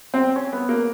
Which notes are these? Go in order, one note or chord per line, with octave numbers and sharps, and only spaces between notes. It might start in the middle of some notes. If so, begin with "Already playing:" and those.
C4
C#4
B3
A#3